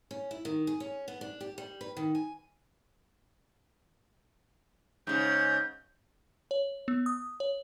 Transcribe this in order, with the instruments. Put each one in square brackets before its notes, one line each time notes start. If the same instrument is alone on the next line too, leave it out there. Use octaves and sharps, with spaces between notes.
[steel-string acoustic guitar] C#4
E4
D#3
G#4
C#4
B3
D4
G4
G3
B4
D#3
G#5
[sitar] G#2 C#3 [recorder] G6
[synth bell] C#5
B3
D#6
C#5